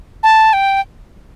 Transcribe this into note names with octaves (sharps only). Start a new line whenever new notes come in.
A5
G5